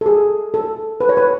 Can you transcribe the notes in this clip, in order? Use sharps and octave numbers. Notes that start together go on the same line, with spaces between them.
A4
G#4
A4
B4
C#5
B4